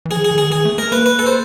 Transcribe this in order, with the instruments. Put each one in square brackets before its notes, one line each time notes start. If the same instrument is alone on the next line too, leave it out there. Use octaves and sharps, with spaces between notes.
[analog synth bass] E3
[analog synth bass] F3 [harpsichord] G#4
[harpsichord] G#4
[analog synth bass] D#3
[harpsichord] G#4
[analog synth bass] E3 [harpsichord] G#4
[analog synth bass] A3
[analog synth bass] A3 [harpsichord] A#4
[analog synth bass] A#3 [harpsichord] B4
[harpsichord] B4
A4
C5